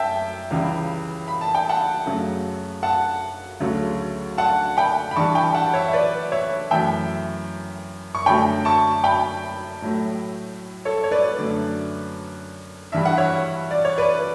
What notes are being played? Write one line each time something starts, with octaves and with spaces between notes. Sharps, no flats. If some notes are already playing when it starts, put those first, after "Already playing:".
Already playing: F#2 E5 G5 A5
C#2 C#3 E3 G3
B5
A5
G5
F#5 A5
F#2 C#3 F#3 A3
F#5 A5
D2 C#3 F#3 A3
F#5 A5
G5 B5
B5
G2 E3 G3 A5 C#6
G5 B5
F#5 A5
C#5 E5
E5
B4 D5
C#5 E5
F#2 E3 A3 E5 G5
C#6
F#2 D3 F#3 A3 G5 B5
A5 C#6
G5 B5
A2 F#3 A3
A4 C#5
C#5
B4 D5
F#2 D3 A3
G2 E3 G3 E5
F#5
C#5 E5
D5
C#5
B4 D5